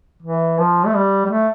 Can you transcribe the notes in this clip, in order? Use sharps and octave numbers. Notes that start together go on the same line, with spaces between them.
E3
F3
A3
G3
G3
A3